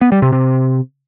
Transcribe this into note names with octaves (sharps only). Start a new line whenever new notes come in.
B3
G3
C3
C3